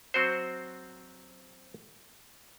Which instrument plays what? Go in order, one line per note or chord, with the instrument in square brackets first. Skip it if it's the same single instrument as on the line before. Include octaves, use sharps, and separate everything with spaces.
[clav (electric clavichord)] F#3 C4 F#4 C5